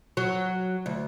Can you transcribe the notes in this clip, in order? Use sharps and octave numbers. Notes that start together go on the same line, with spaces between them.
F#3
D2